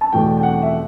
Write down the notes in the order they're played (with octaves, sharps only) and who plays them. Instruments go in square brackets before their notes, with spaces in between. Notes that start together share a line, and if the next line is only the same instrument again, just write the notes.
[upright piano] A5
E2 B2 A3 G5
G5
F#5
E5